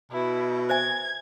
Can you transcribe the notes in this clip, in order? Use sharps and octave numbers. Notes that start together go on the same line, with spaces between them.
B2 E4
C5 E5 G#5 G#6